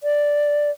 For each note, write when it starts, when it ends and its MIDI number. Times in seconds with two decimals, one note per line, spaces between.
0.03 0.71 74